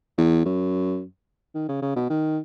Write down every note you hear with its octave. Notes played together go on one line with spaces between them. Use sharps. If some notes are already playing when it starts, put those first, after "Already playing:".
E2
F#2
D#3
C#3
C#3
B2
D#3